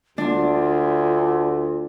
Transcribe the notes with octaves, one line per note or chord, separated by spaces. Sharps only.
D2 D4 F4